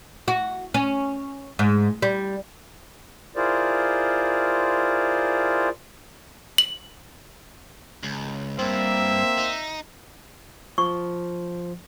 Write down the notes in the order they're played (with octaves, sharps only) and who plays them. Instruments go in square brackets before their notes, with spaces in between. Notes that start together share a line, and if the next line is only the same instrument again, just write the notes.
[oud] F#4
C#4
G#2
G3
[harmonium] E4 F4 G#4 A#4 C5 D5
[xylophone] F#7
[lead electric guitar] C#2
[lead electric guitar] G2 [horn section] A#3 C4 [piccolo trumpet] E5
[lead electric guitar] D#4
[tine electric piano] F3 [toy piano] C#6